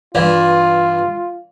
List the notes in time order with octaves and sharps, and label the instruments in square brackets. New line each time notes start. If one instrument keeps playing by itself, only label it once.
[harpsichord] G2 E3 [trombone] F4 [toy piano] D5 F5